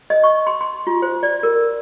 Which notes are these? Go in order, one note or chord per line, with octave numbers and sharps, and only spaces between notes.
D#5
C#6
C6
C6
F4
C5
D5
A#4